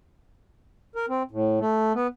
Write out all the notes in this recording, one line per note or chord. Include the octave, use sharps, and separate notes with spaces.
A#4
C4
A2
A3
B3